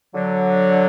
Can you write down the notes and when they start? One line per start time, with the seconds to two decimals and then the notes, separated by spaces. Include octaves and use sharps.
0.14 D3 F#3